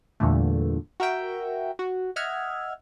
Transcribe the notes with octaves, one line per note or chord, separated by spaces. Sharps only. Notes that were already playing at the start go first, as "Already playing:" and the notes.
E2 G2 A#2 D3 A3
F#4 A#4 E5 G5
F#4
D#5 E5 F#5 F6 G#6